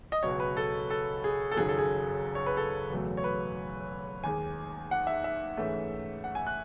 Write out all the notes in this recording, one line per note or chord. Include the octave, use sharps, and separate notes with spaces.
D#5
C#2 B2 F#3 C#5
B4
A4
A4
G#4
A4
F#1 F#2 D#3 F#3 G#4
A4
G#4
C#5
B4
A4
F#1 E2 B2 F#3 A3
C#5
B4
D#2 D#3 G#3 G#5
F#5
E5
E5
G#2 E3 A3 C#4 E4
F#5
G#5
F#6